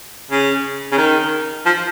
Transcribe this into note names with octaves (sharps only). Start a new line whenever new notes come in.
C#3
C#3
D#3
F3